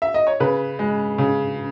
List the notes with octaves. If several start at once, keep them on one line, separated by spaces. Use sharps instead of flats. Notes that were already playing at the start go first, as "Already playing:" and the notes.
E5
D#5
C#5
C#3 B4
G#3
C#3